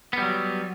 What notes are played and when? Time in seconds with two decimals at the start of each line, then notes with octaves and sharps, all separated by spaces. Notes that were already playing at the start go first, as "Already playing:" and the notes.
0.13 B3
0.18 G3
0.22 F#3